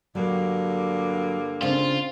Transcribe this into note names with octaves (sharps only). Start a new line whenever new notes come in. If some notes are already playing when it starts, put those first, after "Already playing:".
G2 D3 F#3 A#3
C#3 C4 D4 F4